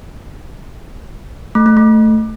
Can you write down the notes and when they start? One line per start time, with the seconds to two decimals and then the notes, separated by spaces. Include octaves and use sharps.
1.55 A3
1.66 A3
1.77 A3